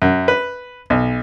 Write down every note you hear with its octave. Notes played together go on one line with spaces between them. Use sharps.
F#2
B4
B1